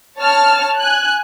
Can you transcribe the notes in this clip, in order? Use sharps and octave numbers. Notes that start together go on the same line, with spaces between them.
C#5 A5 F6
G#5 F#6